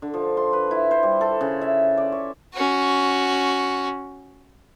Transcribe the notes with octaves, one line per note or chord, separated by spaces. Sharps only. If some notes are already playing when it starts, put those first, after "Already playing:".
D3
F3
C6
B4
E4
C5
G3
A4
C#3
E5
D5
C#5
C#4 F#4